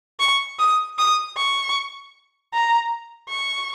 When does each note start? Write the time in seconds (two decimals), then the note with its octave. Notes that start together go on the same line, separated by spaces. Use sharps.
0.20 C#6
0.59 D#6
0.98 D#6
1.37 C#6
2.53 A#5
3.30 C#6